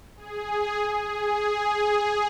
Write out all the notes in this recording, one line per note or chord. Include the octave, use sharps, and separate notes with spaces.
G#4
G#4
G#4